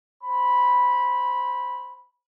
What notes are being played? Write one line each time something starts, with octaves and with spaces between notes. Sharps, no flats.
C5 B5